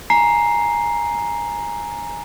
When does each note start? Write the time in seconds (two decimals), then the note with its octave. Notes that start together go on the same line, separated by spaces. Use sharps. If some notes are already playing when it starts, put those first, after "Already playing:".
0.10 G#5 A#5 C7